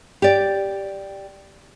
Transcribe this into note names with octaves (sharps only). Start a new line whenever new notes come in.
G4 D5